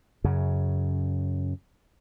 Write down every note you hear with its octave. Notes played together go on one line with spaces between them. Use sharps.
F#2 C#3